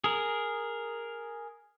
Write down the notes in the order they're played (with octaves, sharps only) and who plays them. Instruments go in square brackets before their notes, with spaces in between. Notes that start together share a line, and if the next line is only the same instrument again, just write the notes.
[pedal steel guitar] G#4 A#4